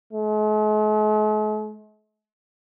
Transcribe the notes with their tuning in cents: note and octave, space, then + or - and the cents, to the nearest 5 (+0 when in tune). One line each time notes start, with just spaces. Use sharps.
G#3 +45